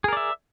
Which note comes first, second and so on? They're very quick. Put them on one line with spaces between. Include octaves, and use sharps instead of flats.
G#4 A#4 D5 E5